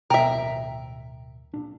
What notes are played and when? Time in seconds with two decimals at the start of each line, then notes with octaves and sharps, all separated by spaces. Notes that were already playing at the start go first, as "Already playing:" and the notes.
0.10 D1 B2 A#4 E5 G5
1.54 A#2 D4